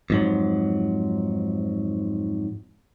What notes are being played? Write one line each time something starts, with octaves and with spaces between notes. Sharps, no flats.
F2 G#2 F#3